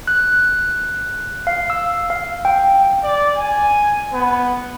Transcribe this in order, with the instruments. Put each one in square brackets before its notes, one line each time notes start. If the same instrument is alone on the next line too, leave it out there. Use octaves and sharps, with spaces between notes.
[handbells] F#6
F5
E6
F5
G5
[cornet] D5
G#5
B3